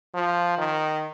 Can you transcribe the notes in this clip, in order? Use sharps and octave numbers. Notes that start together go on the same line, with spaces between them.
F3
D#3